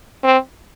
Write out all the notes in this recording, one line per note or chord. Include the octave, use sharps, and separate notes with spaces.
C4